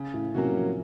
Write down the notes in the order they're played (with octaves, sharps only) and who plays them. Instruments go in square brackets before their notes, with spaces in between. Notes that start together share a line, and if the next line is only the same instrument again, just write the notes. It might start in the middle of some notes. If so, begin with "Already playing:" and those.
Already playing: [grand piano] C#3
[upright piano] A2
[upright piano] C3 [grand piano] F#3 A#3 C#4 F#4
[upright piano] F3